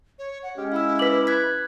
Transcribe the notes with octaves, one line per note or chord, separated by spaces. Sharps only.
C#5
F#5
G#3 C#4 G4
E4 F5 E6
B4 D6 B6 F#7
F#6 G#6 B6